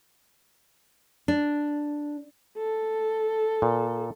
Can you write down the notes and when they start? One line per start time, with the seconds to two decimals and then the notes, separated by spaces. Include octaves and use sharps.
1.28 D4
2.58 A4
3.62 A#2